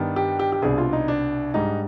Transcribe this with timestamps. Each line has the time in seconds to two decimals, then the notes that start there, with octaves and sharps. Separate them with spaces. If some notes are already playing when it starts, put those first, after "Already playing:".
Already playing: G2 D#3 B3 D4
0.16 G4
0.39 G4
0.52 G4
0.62 C2 B2 B3 D4 G#4
0.78 F4
0.93 D#4
1.08 D4
1.54 G#2 G3 D4 D#4